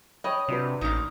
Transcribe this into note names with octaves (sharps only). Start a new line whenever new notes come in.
C#5 D#5 G5 B5
C3 D4 F#4 B4
A1 A#3 D#4